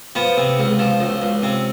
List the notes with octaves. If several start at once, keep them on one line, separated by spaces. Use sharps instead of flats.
F3 B3
C3
C#2
F3
C#2
C#2
C3